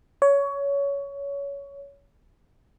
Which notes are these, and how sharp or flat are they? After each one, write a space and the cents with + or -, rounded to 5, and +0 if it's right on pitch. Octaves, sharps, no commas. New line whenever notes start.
C#5 +20